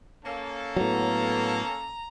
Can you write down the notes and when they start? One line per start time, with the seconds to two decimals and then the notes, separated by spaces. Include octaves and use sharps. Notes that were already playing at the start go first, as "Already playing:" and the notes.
0.25 A#3 C#4 A4
0.76 A2 F#3 B3 A#5